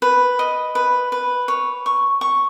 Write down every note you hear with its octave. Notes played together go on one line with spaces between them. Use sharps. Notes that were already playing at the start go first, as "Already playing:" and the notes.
B4
D#5
B4
B4
C#5
C#6
C#6